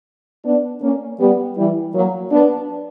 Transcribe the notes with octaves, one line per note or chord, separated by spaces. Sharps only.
B3 D4
A#3 C#4
G3 B3
E3 G3
F#3 A#3
B3 D4